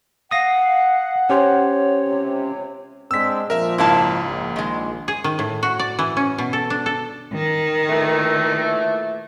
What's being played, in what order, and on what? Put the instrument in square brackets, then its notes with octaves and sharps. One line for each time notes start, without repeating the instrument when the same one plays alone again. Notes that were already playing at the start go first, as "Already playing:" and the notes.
[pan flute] F5 [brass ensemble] F#5 [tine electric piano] D#6 A#6
[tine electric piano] C#4 G4 C5 [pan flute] C#5
[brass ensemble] C#2 C3
[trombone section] G#3 C4 D4 [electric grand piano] E6 B6
[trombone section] A#2 F3 [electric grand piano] A#4 E5
[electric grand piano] C#2 G#2 [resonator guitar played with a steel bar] E4 F5 A5
[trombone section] A#1
[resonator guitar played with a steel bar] D#3 G#3
[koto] G#4
D#3
A2
F#4
D5
E3
C#4
B2
A4
D4
A4
[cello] D#3
[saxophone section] A#2 E3 A3